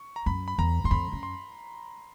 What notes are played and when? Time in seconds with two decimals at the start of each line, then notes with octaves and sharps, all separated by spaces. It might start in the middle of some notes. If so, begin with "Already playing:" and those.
Already playing: C#6
0.16 A#5
0.26 F#2 B5
0.48 B5
0.58 E2 A#5
0.84 F#2 C6
0.91 F2 B5
1.12 F#2
1.23 C6